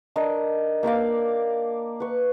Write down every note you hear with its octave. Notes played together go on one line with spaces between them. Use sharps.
D4 A#4 D#5
A#3 A#4 D5 F5
B4 C#6